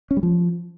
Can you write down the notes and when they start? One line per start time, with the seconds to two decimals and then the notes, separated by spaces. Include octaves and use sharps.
0.11 C#4
0.17 G3
0.23 F3